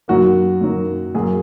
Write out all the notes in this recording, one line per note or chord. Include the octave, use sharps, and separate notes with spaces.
F#2 D#3 F#3 A#3 F#4
F#2 D#3 F#3 A#3
F#2 F#3 A#3 G#4